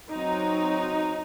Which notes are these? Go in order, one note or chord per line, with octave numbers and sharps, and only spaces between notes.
F#3 C4 D#4